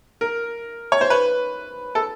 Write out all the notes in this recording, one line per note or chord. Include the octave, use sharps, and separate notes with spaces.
A#4
C#5
C5
B4
A4